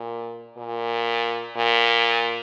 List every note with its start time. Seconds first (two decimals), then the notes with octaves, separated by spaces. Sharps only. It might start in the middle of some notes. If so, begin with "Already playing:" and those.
Already playing: A#2
0.57 A#2
1.56 A#2